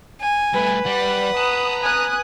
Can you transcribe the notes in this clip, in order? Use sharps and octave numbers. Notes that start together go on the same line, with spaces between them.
G#5
G2 A3 B4
G3 D5 F#5
A5 A#5 D#6
G#5 D#6 F#6